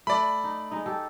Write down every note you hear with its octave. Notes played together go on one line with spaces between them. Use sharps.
A3 B4 D5 B5
D#4
G#3 D#4
G4 A4